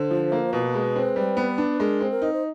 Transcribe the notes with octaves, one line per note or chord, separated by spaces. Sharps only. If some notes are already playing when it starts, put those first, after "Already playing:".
Already playing: D3 C5
F3
A#3
B2 B4
G#3
C4
G3
B3
D4
G#3 A#4
C4
A#4
D#4
C5